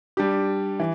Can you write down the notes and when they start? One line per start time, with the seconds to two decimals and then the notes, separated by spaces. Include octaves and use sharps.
0.17 G3 D4 G4
0.80 E3